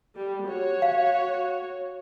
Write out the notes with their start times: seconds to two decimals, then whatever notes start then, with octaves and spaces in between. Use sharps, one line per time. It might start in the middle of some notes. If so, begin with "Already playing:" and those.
0.15 G3
0.47 F#4 C#5
0.82 F5